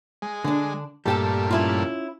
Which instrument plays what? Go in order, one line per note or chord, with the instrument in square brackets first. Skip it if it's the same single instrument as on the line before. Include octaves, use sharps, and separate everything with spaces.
[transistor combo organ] G#3
[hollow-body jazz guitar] D3 D4
[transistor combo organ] G2 A#2 A3 [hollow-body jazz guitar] G3 G4 A4
[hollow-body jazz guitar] C#4 E4 F4